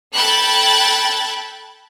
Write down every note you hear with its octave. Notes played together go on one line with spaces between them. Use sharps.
A4 G5 B5 F#6 G#6 A6